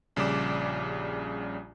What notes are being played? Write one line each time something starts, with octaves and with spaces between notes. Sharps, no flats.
A#1 C#3 G3 D5 D6 E7